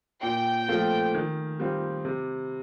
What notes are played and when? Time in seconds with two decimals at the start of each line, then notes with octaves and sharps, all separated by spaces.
0.23 A#2 G5
0.68 F3 A3 C4 F4
1.14 D#3
1.59 G3 C4 F4
2.05 C3